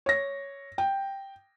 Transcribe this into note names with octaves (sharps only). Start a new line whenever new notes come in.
C#5 A#6
G5